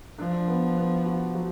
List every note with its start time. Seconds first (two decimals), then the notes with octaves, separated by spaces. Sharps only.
0.18 F3 D4
0.48 B3
0.77 B3
1.06 F#4
1.35 F#3